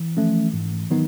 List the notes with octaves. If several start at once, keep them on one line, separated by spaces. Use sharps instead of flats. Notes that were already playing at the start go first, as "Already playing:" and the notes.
Already playing: E3
F3 A3 C#4
G#2
D#3 F#3 B3 D#4